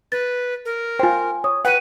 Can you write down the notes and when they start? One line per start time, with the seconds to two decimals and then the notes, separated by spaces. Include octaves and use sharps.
0.12 B4 A6
0.65 A#4
0.99 F4 C5 G5 G#5
1.44 C#5 D#6
1.65 B4 F#5 G5 D#7